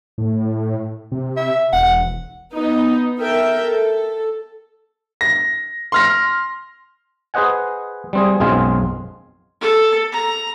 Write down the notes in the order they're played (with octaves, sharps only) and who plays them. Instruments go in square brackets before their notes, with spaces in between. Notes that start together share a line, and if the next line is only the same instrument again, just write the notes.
[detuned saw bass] A2
C3
[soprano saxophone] E5
[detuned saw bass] E1 [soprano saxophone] F#5
[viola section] B3 D#4
A4 A#4 E5 G5
A4
[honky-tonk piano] A#6
C6 F6 A#6
[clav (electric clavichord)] G#4 B4 C5 D#5 F#5 G#5
G3 C4 G#4
B1 F#2 G#3 C4 F4 G#5
[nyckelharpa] A4
A#5